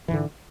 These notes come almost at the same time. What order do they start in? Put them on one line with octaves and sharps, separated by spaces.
E3 G#2 D3